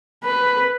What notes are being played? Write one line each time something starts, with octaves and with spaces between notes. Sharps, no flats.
B4